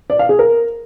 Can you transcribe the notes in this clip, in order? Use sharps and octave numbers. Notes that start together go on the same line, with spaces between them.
D5
F5
G#4
A#4